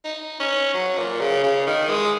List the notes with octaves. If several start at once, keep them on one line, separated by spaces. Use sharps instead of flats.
D#4
C#4
F#3
A#2
C#3
C#3
D#3
G#3